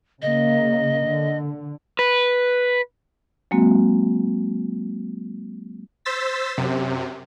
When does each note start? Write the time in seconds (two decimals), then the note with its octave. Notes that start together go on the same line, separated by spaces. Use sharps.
0.22 C#3 A#3 D#5
1.05 D3
1.99 B4
3.51 F#3 G#3 A#3 C4 F#4
6.05 C5 E6 A6 B6
6.58 F#2 C3